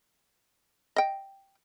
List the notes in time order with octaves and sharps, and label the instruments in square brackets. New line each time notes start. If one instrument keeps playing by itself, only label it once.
[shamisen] D#5 G5